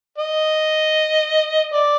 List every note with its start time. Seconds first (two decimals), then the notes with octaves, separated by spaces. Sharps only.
0.18 D#5
1.73 D5